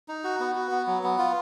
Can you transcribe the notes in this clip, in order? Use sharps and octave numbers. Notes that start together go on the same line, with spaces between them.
D#4
F#4
B3
F#4
B3
F#3
B3
F4